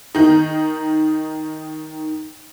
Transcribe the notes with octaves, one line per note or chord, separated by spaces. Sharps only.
D#3 D#4